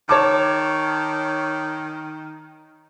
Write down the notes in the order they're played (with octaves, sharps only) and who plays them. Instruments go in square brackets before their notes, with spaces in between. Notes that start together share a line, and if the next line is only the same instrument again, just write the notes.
[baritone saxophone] D#3 [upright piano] C#5 A5 D6